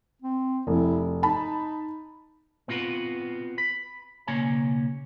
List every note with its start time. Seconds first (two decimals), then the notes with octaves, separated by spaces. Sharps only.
0.22 C4
0.67 F1 E4
1.23 D#4 A5 B5
2.68 B3 C4 F4 F#4 B4
3.58 B5
4.27 B1 C#3 A#3 C#4 C#5 G#5